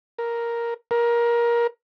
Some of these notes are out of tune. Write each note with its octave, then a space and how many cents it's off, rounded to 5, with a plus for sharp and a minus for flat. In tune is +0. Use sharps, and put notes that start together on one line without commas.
A#4 +5
A#4 +20